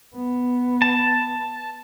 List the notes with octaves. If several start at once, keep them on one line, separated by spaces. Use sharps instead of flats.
B3
A5